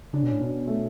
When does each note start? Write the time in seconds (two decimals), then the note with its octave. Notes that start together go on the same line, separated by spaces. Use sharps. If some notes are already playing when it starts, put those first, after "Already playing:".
0.13 C#3 D4
0.23 B2 C#4
0.32 A2
0.41 B2 D4
0.67 A3